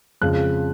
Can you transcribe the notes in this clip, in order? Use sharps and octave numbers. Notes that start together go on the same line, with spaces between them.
F2 C#3 F3 G#3 F#6